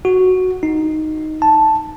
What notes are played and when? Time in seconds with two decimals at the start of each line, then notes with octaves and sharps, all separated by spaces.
0.05 F#4
0.63 D#4
1.42 A5